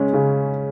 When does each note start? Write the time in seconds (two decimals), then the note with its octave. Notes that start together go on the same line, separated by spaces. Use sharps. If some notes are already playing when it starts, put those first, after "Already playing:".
Already playing: C#3 G#3 C#4
0.14 C#3